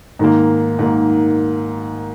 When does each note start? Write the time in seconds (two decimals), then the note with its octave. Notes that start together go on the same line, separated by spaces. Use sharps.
0.19 G#2 D#3 A#3
0.79 G#2 D#3 A#3